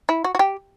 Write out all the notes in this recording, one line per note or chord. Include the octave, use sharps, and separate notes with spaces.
E4
F#4
F#4
G4